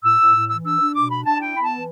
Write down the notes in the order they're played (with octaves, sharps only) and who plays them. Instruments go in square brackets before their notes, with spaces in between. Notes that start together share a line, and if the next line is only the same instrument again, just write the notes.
[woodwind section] A2 E6
A2
A2
E3 E6
D4 E6
D4
B2 D6
D4 B5
D4 A5
E4 G5
B3 B5
A5
E3